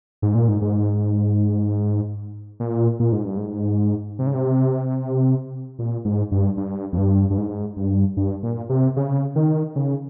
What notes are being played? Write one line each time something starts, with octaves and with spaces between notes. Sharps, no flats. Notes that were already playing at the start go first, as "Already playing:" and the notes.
G#2
A#2
G#2
G#2
A#2
A#2
G#2
G2
G#2
C3
C#3
C3
A#2
G#2
G2
G2
F2
G2
G2
G#2
G2
G2
A#2
C3
C#3
D#3
C#3